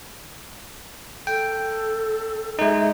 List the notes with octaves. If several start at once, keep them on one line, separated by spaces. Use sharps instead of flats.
A4 G5
G#3 D#4 E5